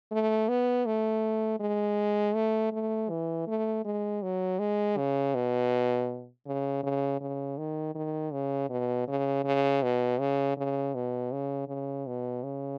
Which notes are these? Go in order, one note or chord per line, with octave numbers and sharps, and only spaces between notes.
A3
B3
A3
G#3
A3
A3
E3
A3
G#3
F#3
G#3
C#3
B2
C#3
C#3
C#3
D#3
D#3
C#3
B2
C#3
C#3
B2
C#3
C#3
B2
C#3
C#3
B2
C#3